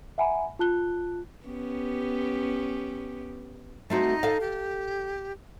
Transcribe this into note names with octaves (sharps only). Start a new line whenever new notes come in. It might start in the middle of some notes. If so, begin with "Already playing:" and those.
E5 F#5 G#5 A#5 B5
F4 A5 F#6 G7
B3 C#4 G4
A3 C4 D#4 F#4
A4 F5
G4